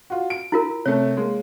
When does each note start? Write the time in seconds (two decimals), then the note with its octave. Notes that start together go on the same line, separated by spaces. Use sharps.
0.10 F4 F#4
0.30 D7
0.52 E4 F4 A#4
0.86 C3 A3 C#5
1.17 G#3 A#3